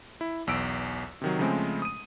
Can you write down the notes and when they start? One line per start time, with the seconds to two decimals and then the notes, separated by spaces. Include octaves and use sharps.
0.21 E4
0.47 B1 E2 E6 D7
1.21 C3 D#3 F#3
1.39 C#3 F3 G#3 A3 C4 C#4
1.82 D#6 D#7